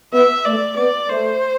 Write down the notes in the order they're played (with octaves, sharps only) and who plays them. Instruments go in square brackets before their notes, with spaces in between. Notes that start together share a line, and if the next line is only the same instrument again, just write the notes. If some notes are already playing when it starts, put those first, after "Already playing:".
[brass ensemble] B3 [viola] E5
[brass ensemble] A3 [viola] D5
[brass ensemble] B3 [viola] D5
[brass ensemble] A3 [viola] C5